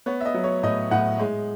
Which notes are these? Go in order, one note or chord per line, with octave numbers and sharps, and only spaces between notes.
B3 C#5
E5
D#5
F#3
C#5
A2 D#5
A2 F#5
G#3